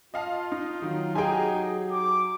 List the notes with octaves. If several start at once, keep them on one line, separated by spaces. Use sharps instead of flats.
F4 D#5 F5 A5
D#4
D#3 F#3
D#4 G4 G#4 G5 G#5
D6